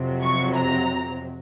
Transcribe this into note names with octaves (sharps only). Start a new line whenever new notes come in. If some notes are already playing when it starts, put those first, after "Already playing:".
Already playing: F2 C3 F#3 C4
C#6
A#5